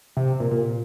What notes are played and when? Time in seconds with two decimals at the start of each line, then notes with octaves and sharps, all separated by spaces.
0.17 C3
0.40 A#2
0.51 A#2